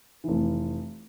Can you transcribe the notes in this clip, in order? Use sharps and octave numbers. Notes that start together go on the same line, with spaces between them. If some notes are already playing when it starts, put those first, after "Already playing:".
F1 E3